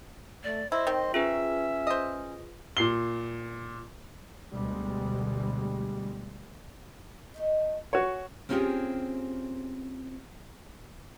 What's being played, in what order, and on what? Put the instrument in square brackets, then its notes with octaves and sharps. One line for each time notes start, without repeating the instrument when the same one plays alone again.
[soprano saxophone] A3 [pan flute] D5
[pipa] E4 [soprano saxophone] C5 [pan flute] D#5
[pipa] D#3 C4
[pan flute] C#4 [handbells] F4 G#4 B4 [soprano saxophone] E5
[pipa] C5 D#5
[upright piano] A#2 C7 G7
[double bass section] D2 B2 G3 G#3
[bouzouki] A3 D#4 D#5
[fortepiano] F#4 C#5 [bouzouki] G#4
[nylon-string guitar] A#3 C4 C#4 F4 G4 G#4